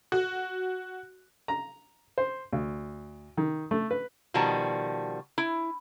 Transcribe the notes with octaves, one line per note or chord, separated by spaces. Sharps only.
F#4
A#5
C5
D2
D#3
A3
B4
B2 D#3 F3 G3 F#4 A5
E4